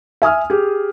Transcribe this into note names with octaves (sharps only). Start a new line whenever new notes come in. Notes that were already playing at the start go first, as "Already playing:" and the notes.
E5 G#5 D#6 F6
G4 G#4